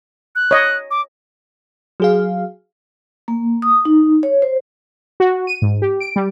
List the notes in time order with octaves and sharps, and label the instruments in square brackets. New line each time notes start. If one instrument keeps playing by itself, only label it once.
[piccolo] F#6
[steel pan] C#5 D#5
[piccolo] D6
[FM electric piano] F#3 G#4 F5
[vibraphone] A#3
D#6
D#4
C#5
C5
[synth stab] F#4
D#7
G#2
G4
D7
G3